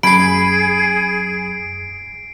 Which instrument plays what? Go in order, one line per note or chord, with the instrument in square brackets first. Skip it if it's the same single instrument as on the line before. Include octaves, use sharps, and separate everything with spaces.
[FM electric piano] F#2 G#5 [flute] G#4 [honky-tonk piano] B5 [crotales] C7 D7